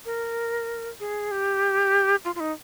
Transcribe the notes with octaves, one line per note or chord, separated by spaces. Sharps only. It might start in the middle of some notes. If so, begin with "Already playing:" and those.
A#4
G#4
G4
F4
F4
D#4